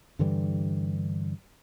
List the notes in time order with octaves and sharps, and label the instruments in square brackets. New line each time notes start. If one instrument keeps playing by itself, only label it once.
[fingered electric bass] G2 D3 E3 G3